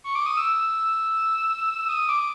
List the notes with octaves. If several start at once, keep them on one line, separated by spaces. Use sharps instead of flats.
C#6
D6
D#6
E6
D#6
D6